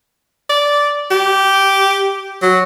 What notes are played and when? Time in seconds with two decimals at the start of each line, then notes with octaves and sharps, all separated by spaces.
0.50 D5
1.11 G4
2.42 F#3